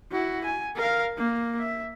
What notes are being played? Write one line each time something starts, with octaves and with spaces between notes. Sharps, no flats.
E4 F#4
G#5
A#4 F5
A#3
E5